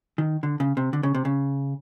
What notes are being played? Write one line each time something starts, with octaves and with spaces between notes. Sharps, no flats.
D#3
D3
C#3
C3
D3
C#3
C3
C#3